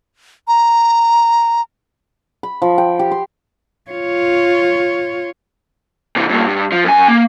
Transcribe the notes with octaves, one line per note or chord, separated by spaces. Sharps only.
A#5
B5
F3
G5
G4
C6
F4 C#5
C3 E3
G2 A#2
G2
F3
F#2 G#5
A#3